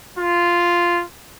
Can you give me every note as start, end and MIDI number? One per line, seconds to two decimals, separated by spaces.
0.19 1.03 65